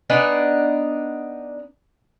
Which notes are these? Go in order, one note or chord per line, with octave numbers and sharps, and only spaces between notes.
B3 D4 D#4 G#5